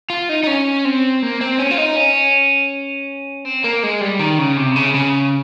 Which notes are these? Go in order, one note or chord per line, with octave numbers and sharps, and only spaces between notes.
F4
D#4
D#4
C#4
C4
A#3
C4
C#4
F4
D#4
C#4
C4
A#3
G#3
G3
D#3
C#3
C3
C#3
C#3